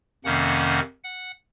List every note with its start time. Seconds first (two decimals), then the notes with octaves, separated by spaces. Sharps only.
0.24 F2 C3 D#3 A#3 C#4 F#5
1.04 F#5